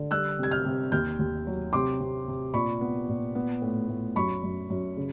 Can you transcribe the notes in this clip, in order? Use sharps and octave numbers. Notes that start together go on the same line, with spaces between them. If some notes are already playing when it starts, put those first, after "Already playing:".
Already playing: D3
G3 E6 F#6
C3 G#6
F6 G6
C3
D#2 F6 G6
D#2
F#3
C3 C6 D6
C3
C3
A#2 B5 C#6
B3
A#2
B3
A2
A2
F#2 B5 C#6
F#2
F#2
C#3